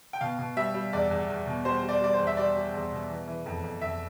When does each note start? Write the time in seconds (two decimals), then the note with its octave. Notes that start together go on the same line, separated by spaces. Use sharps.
0.13 G5
0.21 B2 F5
0.39 B2
0.57 G3 E5
0.74 G3
0.93 E2 D5
1.11 E2
1.29 E2
1.46 B2
1.65 G3 C5
1.83 G3
1.89 D5
2.01 G3 D5
2.13 C5
2.19 E2
2.27 E5
2.37 G3 D5
2.55 G3
2.74 E2
2.92 B2
3.10 E3
3.28 E3
3.46 F2
3.64 F2
3.82 F2 E5